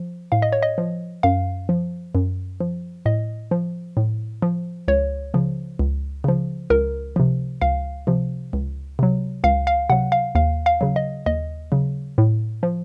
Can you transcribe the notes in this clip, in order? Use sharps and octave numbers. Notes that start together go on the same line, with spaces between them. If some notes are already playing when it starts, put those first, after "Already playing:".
Already playing: F3
A2 F5
D#5
C#5
D#5
F3
F#2 F5
F3
F#2
F3
A2 D#5
F3
A2
F3
C#2 C#5
C#3 F3
C#2
C#3 F3
C#2 A#4
C3 F3
C#2 F5
C3 F3
C#2
C3 F#3
C#2 F5
F5
C3 F#3 F#5
F5
D#2 F5
F5
C#3 F#3
D#5
D#2 D#5
C#3 F#3
A2
F3